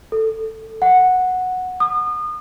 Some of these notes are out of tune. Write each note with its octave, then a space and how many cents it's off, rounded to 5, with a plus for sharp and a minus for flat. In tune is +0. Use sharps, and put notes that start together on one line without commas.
A4 +5
F#5 -5
D#6 -30